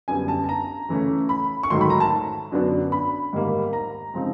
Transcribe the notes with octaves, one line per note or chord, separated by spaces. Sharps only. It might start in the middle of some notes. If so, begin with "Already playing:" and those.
F#2 D3 G3 B3 G#5
A5
A5
A#5
C#3 E3 A3 C#4
B5
C#6
G#2 D#3 F#3 A3 C6
B5
A#5
A5
F#2 D3 F#3 B3 D4
B5
G#2 D#3 G3 A#3
A#5
C#3 F3 G#3 C4 D#4